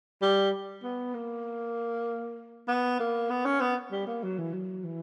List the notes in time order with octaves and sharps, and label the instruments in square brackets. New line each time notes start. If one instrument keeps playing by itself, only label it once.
[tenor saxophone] G3
B3
A#3
B3
A#3
B3
C#4
B3
G3
A#3
F#3
E3
F#3
E3